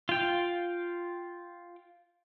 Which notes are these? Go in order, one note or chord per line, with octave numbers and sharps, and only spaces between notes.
F4 G5